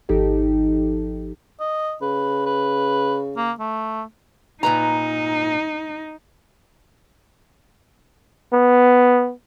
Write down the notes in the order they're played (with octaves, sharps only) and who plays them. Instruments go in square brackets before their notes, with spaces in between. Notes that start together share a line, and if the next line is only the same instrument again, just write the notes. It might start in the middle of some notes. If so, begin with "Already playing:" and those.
[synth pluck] G#1 F3 D#4 G4 A4
[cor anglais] D#5
[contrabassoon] C#3 [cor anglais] B4
[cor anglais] B4
A#3
A3
[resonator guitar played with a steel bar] A#2 B4 A#5 [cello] D#4
[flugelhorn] B3